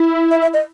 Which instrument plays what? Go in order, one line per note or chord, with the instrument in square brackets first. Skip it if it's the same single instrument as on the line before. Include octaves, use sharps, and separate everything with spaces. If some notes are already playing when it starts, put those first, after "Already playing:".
Already playing: [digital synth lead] E4
[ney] E5
E5
D#5